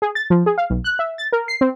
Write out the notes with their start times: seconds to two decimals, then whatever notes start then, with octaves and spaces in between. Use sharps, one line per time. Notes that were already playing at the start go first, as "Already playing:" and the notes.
0.02 G#4
0.15 A6
0.30 F3
0.46 G#4
0.58 F5
0.70 B1
0.84 F#6
0.99 E5
1.18 A6
1.32 A#4
1.48 C7
1.61 C4